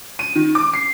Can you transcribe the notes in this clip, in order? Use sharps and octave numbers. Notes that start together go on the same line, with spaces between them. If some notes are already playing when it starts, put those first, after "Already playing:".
D#7
D#3
D6
C7